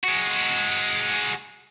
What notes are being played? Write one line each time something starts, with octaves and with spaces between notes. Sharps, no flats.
G#3 F#4